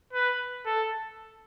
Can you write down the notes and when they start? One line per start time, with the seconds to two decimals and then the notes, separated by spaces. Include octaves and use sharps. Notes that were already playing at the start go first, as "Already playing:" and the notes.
0.13 B4
0.66 A4